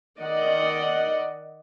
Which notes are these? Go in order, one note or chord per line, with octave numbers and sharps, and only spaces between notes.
D#3 D5 D#5 F#5